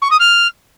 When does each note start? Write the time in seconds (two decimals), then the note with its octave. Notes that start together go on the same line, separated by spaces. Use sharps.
0.02 C#6
0.11 D#6
0.20 F6